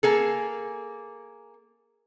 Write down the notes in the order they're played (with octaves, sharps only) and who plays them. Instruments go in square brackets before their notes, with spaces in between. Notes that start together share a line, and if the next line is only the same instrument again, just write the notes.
[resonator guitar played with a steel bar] A#3 G#4 A4